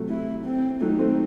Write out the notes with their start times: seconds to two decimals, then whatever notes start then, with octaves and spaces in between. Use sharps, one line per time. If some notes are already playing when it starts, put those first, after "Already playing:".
Already playing: C3 F#3 A3
0.09 E4
0.45 C4
0.81 F#3 A3 D#4
0.99 A3 C4